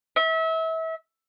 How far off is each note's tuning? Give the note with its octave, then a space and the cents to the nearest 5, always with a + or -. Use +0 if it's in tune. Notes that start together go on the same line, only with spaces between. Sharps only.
E5 -30